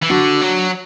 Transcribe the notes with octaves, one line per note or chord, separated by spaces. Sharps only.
E3
D3 D4 F#4
F#3